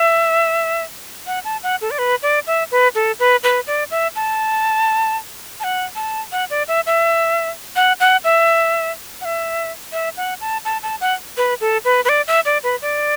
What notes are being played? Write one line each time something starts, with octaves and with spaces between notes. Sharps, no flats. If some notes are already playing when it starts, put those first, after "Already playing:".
Already playing: E5
F#5
A5
F#5
A4
D5
B4
D5
E5
B4
A4
B4
B4
D5
E5
A5
A5
F#5
A5
F#5
D5
E5
E5
F#5
F#5
E5
F#5
E5
E5
F#5
A5
A5
A5
F#5
B4
A4
B4
B4
D5
E5
D5
B4
D5